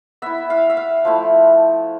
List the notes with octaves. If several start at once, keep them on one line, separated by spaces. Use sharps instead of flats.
B3 E4 E5
F5
E5
F5
F3 A3 E4